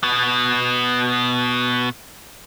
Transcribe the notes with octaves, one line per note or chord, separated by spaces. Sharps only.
B2 B3